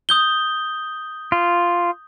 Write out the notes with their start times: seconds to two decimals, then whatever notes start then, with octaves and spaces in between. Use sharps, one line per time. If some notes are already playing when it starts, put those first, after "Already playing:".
0.09 D#6 G6 G7
1.32 F4